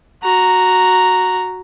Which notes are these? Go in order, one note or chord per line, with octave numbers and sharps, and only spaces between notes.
F#4 A#5